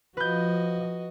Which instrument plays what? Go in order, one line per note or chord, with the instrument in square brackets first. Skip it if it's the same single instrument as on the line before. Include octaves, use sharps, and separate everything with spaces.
[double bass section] F3 [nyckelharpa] F#4 D#5 [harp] B4 G6